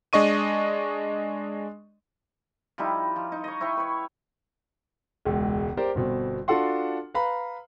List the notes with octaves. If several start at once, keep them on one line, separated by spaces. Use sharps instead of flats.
G#3 D4 D#5 C#6 D#7
F3 G3 D#4 E4
F3
D#4
C#5 D#5
E4 C#5 G5 C#6
B4 C#5
E1 C#2
G4 A#4 C5 D5
G1 B2 C4
D4 F4 F#4 A4 F#5 C6
B4 F5 A#5 B5